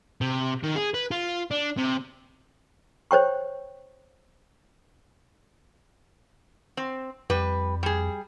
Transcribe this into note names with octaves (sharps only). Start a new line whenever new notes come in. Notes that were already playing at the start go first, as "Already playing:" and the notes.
C3
D#3
G#4
B4
F4
D4
C3
C5 C#5 G5 C#6
C4
F2 G3 B4
G3 G#4